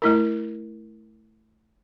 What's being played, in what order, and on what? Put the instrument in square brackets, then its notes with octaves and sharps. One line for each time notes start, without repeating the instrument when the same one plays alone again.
[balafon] A3 E4 A#4